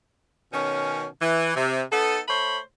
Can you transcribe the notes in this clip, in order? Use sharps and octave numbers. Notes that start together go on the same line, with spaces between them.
B2 D#3 C#4
E3
C3
B3 D#4 A4
A3 C5 C#5 B5